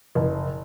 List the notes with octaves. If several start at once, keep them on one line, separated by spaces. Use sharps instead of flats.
F#1